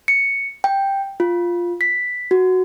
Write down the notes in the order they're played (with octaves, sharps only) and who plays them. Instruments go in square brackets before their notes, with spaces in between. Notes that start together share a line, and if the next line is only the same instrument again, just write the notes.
[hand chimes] C#7
G5
F4
B6
F#4